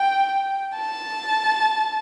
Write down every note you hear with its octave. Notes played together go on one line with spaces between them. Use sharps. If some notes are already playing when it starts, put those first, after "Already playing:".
Already playing: G5
A5